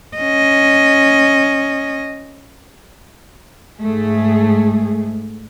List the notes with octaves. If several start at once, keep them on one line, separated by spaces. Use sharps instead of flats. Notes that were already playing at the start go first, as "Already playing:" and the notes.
C#4 D#5
G#2 A3 G#4